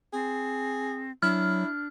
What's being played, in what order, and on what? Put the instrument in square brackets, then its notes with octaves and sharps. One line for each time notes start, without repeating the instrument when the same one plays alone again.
[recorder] C4 [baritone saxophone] G#4
[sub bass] F#3 [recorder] D4 [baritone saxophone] E4 [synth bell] F6